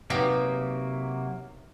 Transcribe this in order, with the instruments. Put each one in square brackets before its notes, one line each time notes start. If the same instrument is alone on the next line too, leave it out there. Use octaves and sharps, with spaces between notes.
[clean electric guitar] C3 F#3 A#3 [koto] B3 D#4 G4